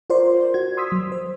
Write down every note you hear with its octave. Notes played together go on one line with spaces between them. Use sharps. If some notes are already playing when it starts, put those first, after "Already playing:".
F4 A#4 C5 D5 C6
F#4 G#6
C6 D#6 E6 B6
F#3
C5